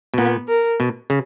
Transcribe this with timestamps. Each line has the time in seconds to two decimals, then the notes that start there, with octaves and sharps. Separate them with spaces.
0.14 B2
0.18 A#2 B3
0.48 A#4
0.80 B2
1.10 C#3